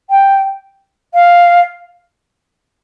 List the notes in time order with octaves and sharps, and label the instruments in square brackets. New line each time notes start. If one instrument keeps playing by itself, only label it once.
[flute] G5
F5